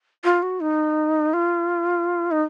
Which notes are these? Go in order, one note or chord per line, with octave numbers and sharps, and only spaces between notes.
F4
F#4
D#4
F4
D#4